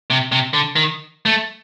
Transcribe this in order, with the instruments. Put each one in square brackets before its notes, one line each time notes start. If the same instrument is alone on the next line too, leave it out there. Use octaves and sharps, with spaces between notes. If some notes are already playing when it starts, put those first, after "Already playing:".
[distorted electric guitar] C3
C3
D3
D#3
A3